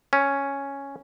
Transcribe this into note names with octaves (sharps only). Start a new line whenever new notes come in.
C#4